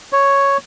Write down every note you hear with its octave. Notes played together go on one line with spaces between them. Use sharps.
C#5